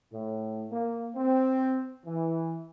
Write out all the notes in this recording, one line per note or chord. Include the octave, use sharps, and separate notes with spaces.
A2
A#3
C4
E3